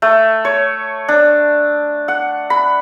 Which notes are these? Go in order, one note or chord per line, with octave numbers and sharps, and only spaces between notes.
A3
C#5
D4
F#5
B5